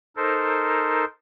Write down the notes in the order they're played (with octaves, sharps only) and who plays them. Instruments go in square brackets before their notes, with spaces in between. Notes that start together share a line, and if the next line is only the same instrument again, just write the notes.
[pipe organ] D#4 A4 A#4 C5